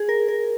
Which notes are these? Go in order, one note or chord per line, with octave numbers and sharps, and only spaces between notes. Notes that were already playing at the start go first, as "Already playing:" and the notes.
Already playing: G#4
A#4
A#4